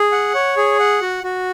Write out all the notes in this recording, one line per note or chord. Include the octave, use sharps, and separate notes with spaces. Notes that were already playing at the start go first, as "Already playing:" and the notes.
Already playing: G#4
F#5
C#5
G#4
F#5
F#4
F#4